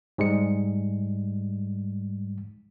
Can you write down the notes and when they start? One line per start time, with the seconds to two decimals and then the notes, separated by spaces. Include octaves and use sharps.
0.18 G#2 G3 G#3 C#7